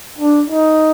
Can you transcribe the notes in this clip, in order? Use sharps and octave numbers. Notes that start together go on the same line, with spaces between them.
D4
D#4